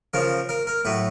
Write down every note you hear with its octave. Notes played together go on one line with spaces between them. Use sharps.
C#3 F3 A#4
A#4
A#4
A2 F#3 B4